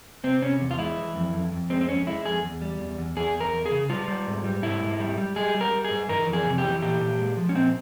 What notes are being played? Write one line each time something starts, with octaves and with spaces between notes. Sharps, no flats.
C3 C4
C3 C#4
E2
F4
G#3 E4
E3
F2
F2
F2
G#3 C4
C4
F2 C#4
G#3 E4
F2 G#4
E2
G3
E2
E2
E2 G#4
E2
A#4
E2
G#4
C#3
G3 F4
G3
G#2
G3
G#2 E4
G#2
G3
G3
G3 G#4
G3
A#4
G3
G#4
G2
E3 A#4
F2
G#4
C3
G4
E3
A#2 G4
A#2
G#3
F3
C#4
A#2 C4